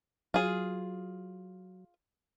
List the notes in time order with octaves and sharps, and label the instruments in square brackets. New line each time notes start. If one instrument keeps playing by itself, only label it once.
[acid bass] F#3 [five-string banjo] F4 G#4